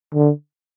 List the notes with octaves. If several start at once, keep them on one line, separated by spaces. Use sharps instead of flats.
D3